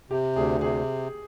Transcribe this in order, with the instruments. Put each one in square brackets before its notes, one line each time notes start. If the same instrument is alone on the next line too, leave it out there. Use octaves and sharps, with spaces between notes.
[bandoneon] C3 [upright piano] G4
[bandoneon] D2 [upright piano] G#4
[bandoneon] C3 [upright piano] G#4